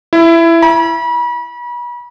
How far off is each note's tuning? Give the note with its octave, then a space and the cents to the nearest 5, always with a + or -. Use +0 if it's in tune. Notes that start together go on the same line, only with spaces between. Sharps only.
E4 +15
B5 -40